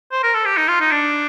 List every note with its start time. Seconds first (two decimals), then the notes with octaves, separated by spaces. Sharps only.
0.12 C5
0.23 A#4
0.34 A4
0.45 G4
0.57 D#4
0.69 F4
0.80 D#4
0.92 D4